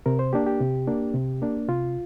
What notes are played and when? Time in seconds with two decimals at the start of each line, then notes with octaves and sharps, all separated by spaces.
0.06 C3 A#4
0.19 C5
0.33 A#3 D4 G4
0.47 G4
0.61 C3
0.88 A#3 D4
1.14 C3
1.42 A#3 D4
1.68 C3 F4